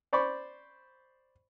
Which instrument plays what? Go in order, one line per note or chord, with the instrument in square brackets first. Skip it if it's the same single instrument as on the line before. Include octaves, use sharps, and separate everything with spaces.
[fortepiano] C5 D5 B5 C#6